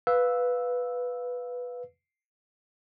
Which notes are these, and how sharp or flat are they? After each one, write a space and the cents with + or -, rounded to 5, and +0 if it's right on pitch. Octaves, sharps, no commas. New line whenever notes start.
B4 +0 F5 +10 E6 -5